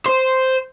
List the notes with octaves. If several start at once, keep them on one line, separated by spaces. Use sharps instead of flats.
C5